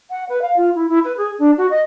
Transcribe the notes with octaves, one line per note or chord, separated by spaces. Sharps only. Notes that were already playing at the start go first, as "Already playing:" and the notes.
F#5
B4
F5
F4
E4
E4
B4
G#4
D4
F#4
D#5